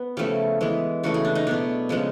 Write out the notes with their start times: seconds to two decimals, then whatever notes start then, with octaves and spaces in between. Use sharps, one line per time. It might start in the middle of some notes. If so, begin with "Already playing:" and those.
Already playing: B3
0.17 C#3 F3 A3 G4
0.61 E3 G#3 B3
1.03 C#3 E3 A3 F#4
1.14 G#4
1.25 D4
1.35 D#4
1.47 B2 F#3 B3 D4
1.89 C#3 F3 G#3 B3